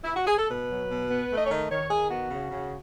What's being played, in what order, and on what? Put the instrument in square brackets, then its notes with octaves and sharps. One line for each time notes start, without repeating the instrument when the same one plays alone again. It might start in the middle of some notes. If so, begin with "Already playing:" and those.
[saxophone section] E4
F#4
G#4
A4
B2 B4
F#3
B2
B3
A3
D#5
C#5
D#3 D#5
D#3 C#5
D#3 G#4
B3 F#4
C#3
C#3